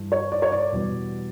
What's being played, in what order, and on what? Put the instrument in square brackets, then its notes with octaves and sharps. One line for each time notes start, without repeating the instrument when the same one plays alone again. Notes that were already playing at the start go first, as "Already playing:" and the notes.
Already playing: [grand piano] G2 E3 G3
[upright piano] C#5
D5
C#5
D5
[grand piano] E2 B2 G3 B3